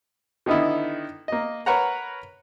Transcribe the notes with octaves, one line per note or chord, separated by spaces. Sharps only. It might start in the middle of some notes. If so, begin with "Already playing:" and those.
D3 D#3 B3 D#4 E4
A#3 D#5
A#4 B4 C#5 F#5 A#5